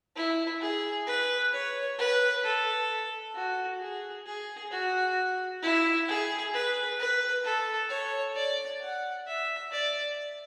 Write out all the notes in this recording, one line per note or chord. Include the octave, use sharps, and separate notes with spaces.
E4
G#4
B4
C#5
B4
A4
F#4
G#4
G#4
F#4
E4
G#4
B4
B4
A4
C#5
D5
F#5
E5
D5